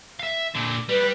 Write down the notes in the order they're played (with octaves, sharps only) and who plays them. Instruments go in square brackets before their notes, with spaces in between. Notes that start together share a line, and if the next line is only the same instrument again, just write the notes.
[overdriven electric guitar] E5 F5
A#2 D3
[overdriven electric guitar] G3 [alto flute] B4